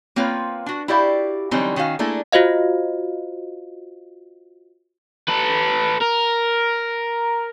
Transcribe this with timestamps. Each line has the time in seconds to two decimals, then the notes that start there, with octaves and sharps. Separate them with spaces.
0.16 A#3 C4 F4 B4 C#5
0.66 D4 F#4
0.88 E4 F#4 G4 D5 E5 F5
1.51 D3 E3 F#3 G3 C4 D#4
1.76 D#3 C#4 F#4 F5
1.99 A3 A#3 D4 E4 G#4 A4
2.32 F4 F#4 C5 D#5 F5
5.28 A4 B4
6.02 A#4